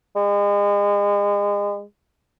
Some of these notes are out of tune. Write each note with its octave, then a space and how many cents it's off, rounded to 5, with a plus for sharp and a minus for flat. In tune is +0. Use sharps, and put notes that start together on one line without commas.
G#3 -35